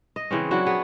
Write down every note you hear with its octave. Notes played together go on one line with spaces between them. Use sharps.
D#5
C#3 E3 C4 C#4
F#3 D4 E4 F#4
B3 G#4